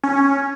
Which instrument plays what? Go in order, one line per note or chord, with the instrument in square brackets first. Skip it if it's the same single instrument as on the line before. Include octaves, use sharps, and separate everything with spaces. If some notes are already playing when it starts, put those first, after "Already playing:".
[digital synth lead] C#4